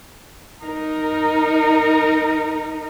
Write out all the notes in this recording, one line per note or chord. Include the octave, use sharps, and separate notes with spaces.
D#4 A#4